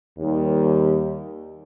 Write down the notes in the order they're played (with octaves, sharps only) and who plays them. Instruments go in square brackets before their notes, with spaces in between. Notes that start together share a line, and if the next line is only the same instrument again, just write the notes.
[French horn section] D#2 D#3 G3